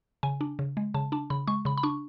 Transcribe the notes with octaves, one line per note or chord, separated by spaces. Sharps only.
C#3 G#5
D4
C#3
G#3
C#3 A5
D4 A5
C#3 B5
G#3 C#6
C#3 B5
B5
D4 C#6